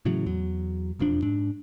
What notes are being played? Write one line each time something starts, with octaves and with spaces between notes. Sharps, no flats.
A2 C#3 E3 F#3
E2 F#3
E1 F2 F3 D4
G#2 D4